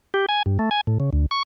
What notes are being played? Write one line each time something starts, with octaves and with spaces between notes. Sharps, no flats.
G4
G#5
G2
A3
G#5
A2
C#3
D2
C#6